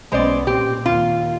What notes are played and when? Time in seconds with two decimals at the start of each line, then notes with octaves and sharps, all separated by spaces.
0.12 B1 G#3 B3 C#4 C5 D5
0.47 A#2 C4 G4
0.86 D#2 F4